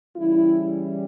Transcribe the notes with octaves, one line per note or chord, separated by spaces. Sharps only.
C#3 E3 G3 C#4 E4